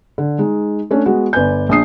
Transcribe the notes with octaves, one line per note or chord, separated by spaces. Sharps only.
D3
G#3 D#4
A3 C#4 D4
G#3 B3 F#4
G1 B4 D5 G#5 G6
A#1 D4 D#6 C7